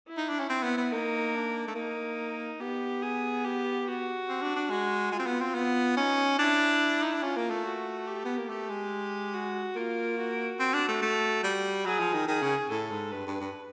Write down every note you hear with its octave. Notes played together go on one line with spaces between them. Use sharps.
E4
D#4
D4
C#4
C4
B3
B3
A#3 D#4
D4
A3
A#3 D#4
B3 G4
G#4
G4
F#4
C4
D4
D4
G#3 F#4
G#3 F4
C4
B3
C4
B3
C#4 D#4
D4 E4
D#4
D4
C#4 F4
A#3
A3
F#4
G4
B3
A#3
A3 G4
G#3
F#4
A#3 F4
F#4
C4
D4
A3
A3
G3
F#3 G#4
F3
D#3
D#3 G#4
C#3
A2 A4
G#2
G2 B4
G2
G2